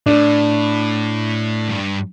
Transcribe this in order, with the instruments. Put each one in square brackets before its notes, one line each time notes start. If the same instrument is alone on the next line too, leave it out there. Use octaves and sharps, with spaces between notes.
[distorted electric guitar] A2 [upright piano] D4
[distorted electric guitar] G2